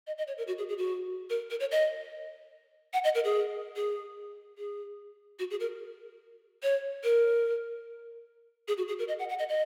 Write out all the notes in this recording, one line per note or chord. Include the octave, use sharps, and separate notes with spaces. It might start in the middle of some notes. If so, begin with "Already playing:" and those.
D#5
D#5
C#5
A#4
F#4
G#4
G#4
F#4
A#4
A#4
C#5
D#5
F#5
D#5
A#4
G#4
G#4
G#4
F#4
G#4
A#4
C#5
A#4
G#4
F#4
G#4
A#4
D#5
F#5
F#5
D#5
D#5